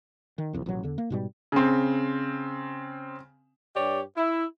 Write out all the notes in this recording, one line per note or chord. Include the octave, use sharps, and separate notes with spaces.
D#3
F#1 C2 F2
A1 B2 F#3
E2 D3
A#3
G#2 B2 G3
C#3 C4
G2 G4 C#5 D5
E4